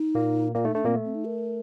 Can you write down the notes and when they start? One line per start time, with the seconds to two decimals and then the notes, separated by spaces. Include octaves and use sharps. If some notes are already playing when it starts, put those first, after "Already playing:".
Already playing: D#4
0.15 A#2 A#3
0.55 A#2 A#3 F4
0.65 A3 D#4
0.75 A3 D4
0.84 A#2 A#3 C4
0.95 A3
1.05 C4
1.15 D#4
1.25 A#4